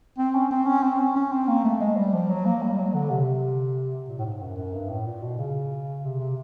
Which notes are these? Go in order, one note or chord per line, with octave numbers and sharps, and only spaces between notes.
C4
C#4
C4
C#4
C4
C#4
C#4
C4
A#3
A3
G#3
G3
F3
F#3
A#3
G3
G3
F#3
D3
C3
A#2
A2
G#2
F#2
F#2
G2
A2
A#2
B2
C#3
C3
C3